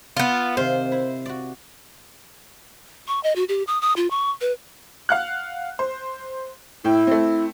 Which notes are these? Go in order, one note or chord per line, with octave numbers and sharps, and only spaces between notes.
B3 F4
C3 D#3 C5 F5
E4
F#4 D5
C#6
D#5
F#4
G4
D#6
D#6
F4
C#6
B4
F5 F#5 F#6
C5
A2 E4 G5
A3 C4